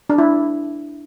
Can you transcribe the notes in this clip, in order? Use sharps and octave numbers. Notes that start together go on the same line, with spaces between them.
D4
E4